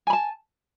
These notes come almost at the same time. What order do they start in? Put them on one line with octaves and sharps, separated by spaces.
G#5 B5 A5